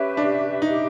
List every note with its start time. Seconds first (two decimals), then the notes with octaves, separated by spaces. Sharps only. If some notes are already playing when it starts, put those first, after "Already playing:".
Already playing: C#4 G4 B4 E5
0.17 D4
0.62 D#4 G4 B4 E5